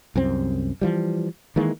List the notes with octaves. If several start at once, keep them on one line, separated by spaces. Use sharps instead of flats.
C2 F#2 C4
E3 F3 G3
D#3 E3 G#3 A#3